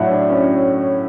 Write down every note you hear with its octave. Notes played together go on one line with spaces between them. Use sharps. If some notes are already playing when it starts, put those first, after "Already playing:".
Already playing: A2 F#3 A3 D4 E4 F#4
D4
C#4